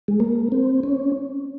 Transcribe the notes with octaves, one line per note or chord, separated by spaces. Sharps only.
G#3
A#3
C4
C#4